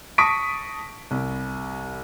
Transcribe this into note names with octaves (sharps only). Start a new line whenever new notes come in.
A5 C#6 D#6 A#6 B6 D7
C2